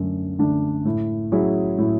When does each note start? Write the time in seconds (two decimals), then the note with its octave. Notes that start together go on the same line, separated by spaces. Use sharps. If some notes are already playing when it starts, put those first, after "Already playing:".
Already playing: F#2 D3 A3
0.39 D3 A3 D4
0.85 A2
1.32 F#3 C#4 E4 G#4
1.78 A2